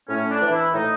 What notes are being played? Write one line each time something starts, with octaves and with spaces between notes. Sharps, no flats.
A2 C#4
D4
E3
E4
A2 D#4